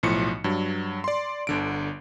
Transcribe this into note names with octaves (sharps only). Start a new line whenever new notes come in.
B1 A2 F3 C#7
G2 F#3
D5 C6
G1 D3 D7